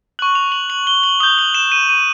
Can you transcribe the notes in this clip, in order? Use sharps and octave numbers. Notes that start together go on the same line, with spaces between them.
C#6 F#6 F#7
F7
F#7
F#7
G7
F#7
D#6 G6 G7
F#7
E7
D#7
D#7